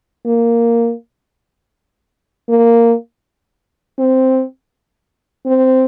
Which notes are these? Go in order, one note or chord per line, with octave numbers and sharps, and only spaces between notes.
A#3
A#3
C4
C4